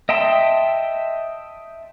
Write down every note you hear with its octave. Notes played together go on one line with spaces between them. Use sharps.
D#5 E5 G5 A5 C6